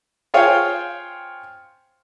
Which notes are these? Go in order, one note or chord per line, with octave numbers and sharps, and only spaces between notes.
F4 G#4 C5 C#5 F5 G5